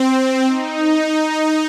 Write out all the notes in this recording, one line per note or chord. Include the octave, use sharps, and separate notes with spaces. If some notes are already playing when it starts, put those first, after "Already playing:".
Already playing: C4
D#4